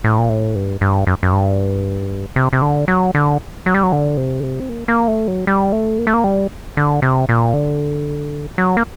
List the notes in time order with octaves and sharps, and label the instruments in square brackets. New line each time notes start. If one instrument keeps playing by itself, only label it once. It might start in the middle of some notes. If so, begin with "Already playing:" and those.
[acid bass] A2
A#2
A2
G2
G2
F#2
F#2
G2
C3
C3
D3
F#3
D3
F#3
G3
F#3
D3
C3
D3
C3
C4
A#3
A#3
A3
F#3
G3
A3
A#3
A3
A#3
G3
D3
C3
A#2
D3
F#3
A#3